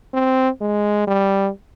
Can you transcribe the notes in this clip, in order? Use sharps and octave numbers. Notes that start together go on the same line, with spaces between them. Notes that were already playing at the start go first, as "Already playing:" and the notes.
C4
G#3
G3